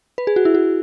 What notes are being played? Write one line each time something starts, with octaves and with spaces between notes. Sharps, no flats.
B4
G#4
F#4
E4
F#4